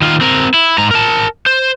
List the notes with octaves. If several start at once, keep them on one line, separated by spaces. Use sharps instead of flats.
D#3 F4
C4 A#4
E4
G#2 A#5
A#4 A5
C5